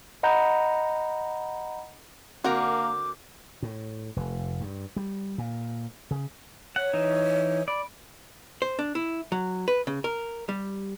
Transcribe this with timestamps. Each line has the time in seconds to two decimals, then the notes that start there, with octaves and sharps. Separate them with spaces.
0.23 D#5 F#5 A#5 B5 G6
2.44 D3 A#3 C4 F#4 A#4 D6
3.63 A2
4.16 F1
4.61 G2
4.96 G3
5.38 A#2
6.11 C#3
6.76 C#5 F#5
6.93 E3 D#4
7.68 D5 B5
8.62 C5
8.79 D4
8.95 E4
9.32 F#3
9.68 B4
9.87 C#3
10.04 A#4
10.49 G3